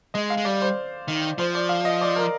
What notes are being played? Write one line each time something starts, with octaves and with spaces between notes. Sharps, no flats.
G#3 D#5
F5
G#3
G3 D5
C5
D#3
F3 C5
D5
F5
D#5
D5
A#4